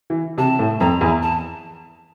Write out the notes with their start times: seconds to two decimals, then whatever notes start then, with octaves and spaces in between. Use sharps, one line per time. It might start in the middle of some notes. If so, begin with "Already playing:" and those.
0.10 E3
0.38 C3 A5
0.59 A2
0.80 F2 A#5
1.01 E2
1.22 A5